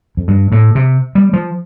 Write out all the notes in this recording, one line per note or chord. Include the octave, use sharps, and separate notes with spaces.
F2
G2
A2
C3
G3
F3